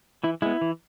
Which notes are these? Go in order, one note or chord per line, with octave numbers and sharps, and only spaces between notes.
E3 E4
G#3 B3 E4
E3